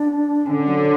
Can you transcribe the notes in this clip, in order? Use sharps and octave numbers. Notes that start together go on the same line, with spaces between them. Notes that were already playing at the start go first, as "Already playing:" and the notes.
Already playing: D4
D3 C#4
F#3